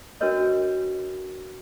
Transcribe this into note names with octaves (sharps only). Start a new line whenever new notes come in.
D4 F#4 A#4 B4 C#5 D#5